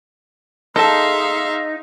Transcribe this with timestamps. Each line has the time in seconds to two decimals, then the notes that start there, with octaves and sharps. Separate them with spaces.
0.76 D#4 G#4 A4 E5 F5 A5 C6